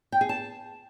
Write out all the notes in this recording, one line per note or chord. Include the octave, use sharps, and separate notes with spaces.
G5
G#4
A5